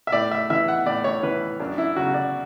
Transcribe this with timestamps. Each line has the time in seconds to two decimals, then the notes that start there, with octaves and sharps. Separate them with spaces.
0.07 E5
0.12 A2 D5
0.31 E5
0.50 E3 E5
0.68 F#5
0.86 A2 D5
1.04 C#5
1.23 E3 B4
1.60 F#2 D4
1.78 E4
1.96 C#3 F#3 F#4
2.14 D5